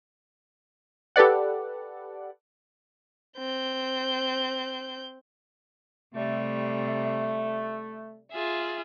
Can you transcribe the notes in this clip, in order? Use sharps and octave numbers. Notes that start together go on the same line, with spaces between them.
G4 A4 B4 D5 F#5
C4 G6
C3 G3 A3
F4 G#4 E5